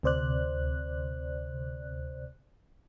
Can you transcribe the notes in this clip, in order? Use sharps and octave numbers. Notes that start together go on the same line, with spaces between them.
D2 C3 C5 D5 F#6